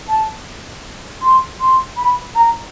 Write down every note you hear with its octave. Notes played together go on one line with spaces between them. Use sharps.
A5
C6
C6
B5
A#5